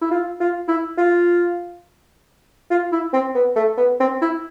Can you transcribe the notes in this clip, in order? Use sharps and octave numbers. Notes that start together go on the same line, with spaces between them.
E4
F4
F4
E4
F4
F4
E4
C4
B3
A3
B3
C4
E4